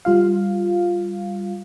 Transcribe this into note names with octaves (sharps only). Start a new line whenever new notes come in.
G3 F4 F5